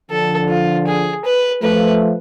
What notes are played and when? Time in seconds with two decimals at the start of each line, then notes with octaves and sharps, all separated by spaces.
0.11 D3 F3 A4
0.50 F4
0.87 G#4
1.25 B4
1.63 F3 A3 B4